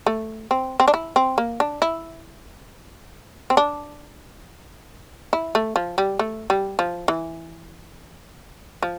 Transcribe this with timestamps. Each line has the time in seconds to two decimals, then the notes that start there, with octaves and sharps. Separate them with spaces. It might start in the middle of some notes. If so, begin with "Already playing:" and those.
0.06 A3
0.51 C4
0.80 C4
0.88 D4
0.94 E4
1.16 C4
1.38 A#3
1.60 D4
1.82 E4
3.50 C4
3.57 D4
5.33 E4
5.55 A3
5.76 F3
5.98 G3
6.19 A3
6.50 G3
6.79 F3
7.08 E3
8.83 F3